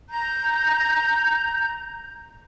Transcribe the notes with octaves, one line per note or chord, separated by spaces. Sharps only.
A#5 G6